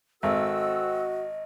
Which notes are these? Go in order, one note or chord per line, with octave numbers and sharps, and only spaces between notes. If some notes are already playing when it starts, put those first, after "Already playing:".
G#1 C4 F#4 A4 D#5 E6